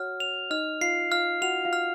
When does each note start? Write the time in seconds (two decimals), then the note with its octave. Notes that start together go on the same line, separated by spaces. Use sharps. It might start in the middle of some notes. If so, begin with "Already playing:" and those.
Already playing: F#4 C#5 F#5 F6
0.20 C#5 F7
0.50 D#4 D#5 F6
0.81 F4 F5 C7
1.11 F4 F5 F6
1.42 F#4 F#5 F7
1.65 F4 F5
1.73 F6